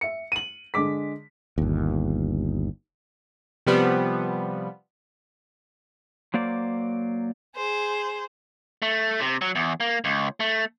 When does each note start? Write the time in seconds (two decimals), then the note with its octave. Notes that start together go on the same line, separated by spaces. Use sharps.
0.01 E5 C#7
0.32 D#7 F#7
0.74 D3 G#3 D6 B6
1.58 G1 D#2
3.66 C3 F3 G3 B3
6.34 F#3 A#3 C5 D5
7.56 G#4 C5
8.82 A3
9.20 C3
9.42 F#3
9.55 E2
9.80 A#3
10.05 C#2
10.40 A3